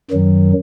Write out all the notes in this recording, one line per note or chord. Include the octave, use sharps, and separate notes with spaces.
F#2 D#3 F#3